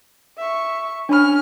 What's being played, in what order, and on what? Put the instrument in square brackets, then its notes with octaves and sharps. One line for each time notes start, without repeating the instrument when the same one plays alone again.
[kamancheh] E5 C#6
[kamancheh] C#4 F6 [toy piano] D4 B5